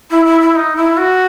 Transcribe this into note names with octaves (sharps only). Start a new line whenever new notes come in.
E4
E4
E4
D#4
E4
F#4